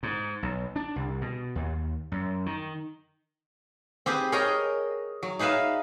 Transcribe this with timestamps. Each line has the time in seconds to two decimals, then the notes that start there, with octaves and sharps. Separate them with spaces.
0.03 G#2
0.43 B1
0.76 D4
0.96 C2
1.22 B2
1.55 D#2
2.12 F#2
2.46 D#3
4.06 C4 G4 G#4 B4
4.32 G#4 A#4 C#5 D#5 G5
5.23 F#3
5.39 D#4 G#4 B4 E5 F5